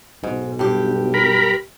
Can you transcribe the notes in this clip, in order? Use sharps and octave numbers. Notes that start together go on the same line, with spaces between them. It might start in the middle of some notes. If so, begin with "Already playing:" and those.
B1 G#2
G2 G4
A#4 B5